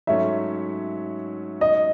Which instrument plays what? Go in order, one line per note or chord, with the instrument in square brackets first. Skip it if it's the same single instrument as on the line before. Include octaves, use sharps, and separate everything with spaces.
[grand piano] G#2 F#3 A3 C#4 [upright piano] E5
[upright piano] D#5